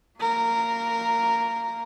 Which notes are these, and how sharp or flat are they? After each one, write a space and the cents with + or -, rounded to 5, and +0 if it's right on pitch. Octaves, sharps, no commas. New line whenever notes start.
A#3 -25 A#4 -10